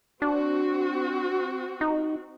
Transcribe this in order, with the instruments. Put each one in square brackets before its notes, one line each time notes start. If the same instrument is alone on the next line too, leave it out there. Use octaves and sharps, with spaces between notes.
[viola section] C4 F#4 [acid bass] D4
[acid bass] D#4